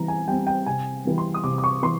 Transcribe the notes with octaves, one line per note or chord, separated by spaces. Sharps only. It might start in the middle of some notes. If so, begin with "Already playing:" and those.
Already playing: E3 G3 C4 A#5
G#5
G3 C4 G5
G5
C3 G#5
E3 G3
C6
D#6
C3 D6
D6
C#6
E3 C6